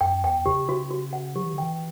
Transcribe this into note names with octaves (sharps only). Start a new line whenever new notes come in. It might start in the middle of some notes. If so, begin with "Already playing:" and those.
F#2 G5
E2 G5
C#3 G4
C#3 F#4
F#4
F#5
F#3 G4
E3
D3
E3 G5